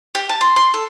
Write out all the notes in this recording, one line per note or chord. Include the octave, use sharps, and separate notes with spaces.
G4
A5
C6
C6
A4